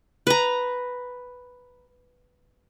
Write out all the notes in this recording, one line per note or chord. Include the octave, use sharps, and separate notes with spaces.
B4 A#5